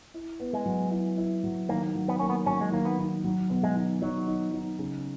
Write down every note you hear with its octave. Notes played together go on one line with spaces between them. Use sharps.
E4
B3
G#3
F#3
E4
E4
F#3
D#3 A#3
F#3
B3
A#3 C#4
B3
F#3 C#4
G#3
D#3 A#3
B3
D#3
F#3
B2
G#3
D#4
F#3 D#4
D#4
D#4
C#3